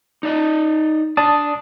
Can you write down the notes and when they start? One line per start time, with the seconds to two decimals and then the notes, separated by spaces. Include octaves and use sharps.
0.23 D#4 D5 D#5
1.17 D4 D5 A5 D#6